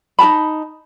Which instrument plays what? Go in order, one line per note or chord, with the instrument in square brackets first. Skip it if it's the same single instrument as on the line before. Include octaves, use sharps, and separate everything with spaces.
[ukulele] D#4 A#4 A5 B5